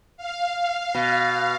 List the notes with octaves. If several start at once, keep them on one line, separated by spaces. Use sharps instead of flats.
F5
B2